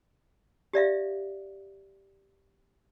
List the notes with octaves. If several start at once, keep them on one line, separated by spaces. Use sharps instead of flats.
G4 D5 E5 F5